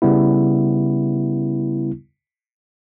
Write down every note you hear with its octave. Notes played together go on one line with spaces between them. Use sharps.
C#3 G3 B3 E4